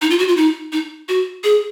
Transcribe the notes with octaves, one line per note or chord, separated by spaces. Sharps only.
D#4
F4
F#4
F4
D#4
D#4
F#4
G#4